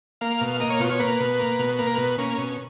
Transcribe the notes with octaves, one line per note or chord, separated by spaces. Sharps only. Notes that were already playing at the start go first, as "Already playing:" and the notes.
A#3 F5
B2
A#3 D#5
C#5
B2 F4
C#5
A#3 B4
B2
A#3
B2
A#3 B4
A#4
B2 B4
A#3 C#4
B2